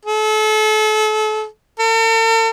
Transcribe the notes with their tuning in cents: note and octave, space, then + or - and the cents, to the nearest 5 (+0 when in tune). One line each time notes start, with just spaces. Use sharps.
A4 -35
A4 +45